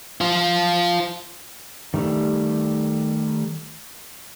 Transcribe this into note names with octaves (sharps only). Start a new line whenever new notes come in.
F4 C5
D#3 G3 A3